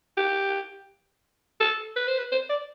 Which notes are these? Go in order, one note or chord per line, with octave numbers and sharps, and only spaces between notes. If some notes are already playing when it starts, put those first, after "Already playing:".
G4
A4
B4
C5
B4
C5
D5